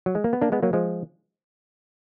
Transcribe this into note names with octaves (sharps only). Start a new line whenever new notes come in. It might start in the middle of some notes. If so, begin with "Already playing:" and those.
F#3
G#3
A#3
B3
A#3 D4
G#3 B3
F#3 A#3
F3 G#3